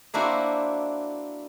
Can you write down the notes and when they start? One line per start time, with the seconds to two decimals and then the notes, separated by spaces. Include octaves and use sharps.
0.14 A#3 C4 D4 E4 F#4 C5